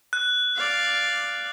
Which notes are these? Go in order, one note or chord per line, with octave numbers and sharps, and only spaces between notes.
F#6
D5 F5